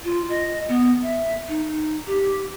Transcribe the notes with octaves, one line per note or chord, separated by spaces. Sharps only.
F4
D#5
B3
E5
D#4
G4